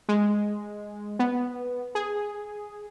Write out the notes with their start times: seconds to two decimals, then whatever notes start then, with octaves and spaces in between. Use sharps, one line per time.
0.09 G#3
1.19 B3
1.95 G#4